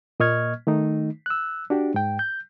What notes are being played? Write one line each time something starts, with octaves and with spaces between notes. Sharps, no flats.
A#2 A#3 D#5 C#6 F6 G#6
D#3 A3 D#4
E6 F#6
D4 F#4 G4
G#2 G5
G6